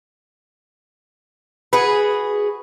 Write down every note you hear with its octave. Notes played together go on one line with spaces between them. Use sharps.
F#4 G#4 B4